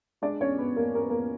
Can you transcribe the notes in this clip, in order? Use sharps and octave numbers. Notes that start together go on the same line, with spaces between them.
G#3 D4 D5
E2 C#4 C#5
E2 B3 B4
E2 A#3 A#4
E2 A#4
B4
E2 A#3 A#4